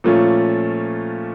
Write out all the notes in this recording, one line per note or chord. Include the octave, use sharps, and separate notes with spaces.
A#2 F3 A3 C#4 F4